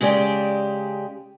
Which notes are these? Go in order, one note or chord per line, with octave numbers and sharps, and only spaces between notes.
C#3 G#3 G4 D5